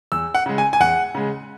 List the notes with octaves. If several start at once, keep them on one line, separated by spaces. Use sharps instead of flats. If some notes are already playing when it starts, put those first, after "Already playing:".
E2 E6
F#5
C#3 G#3
G#5
G#5
E2 F#5
C#3 G#3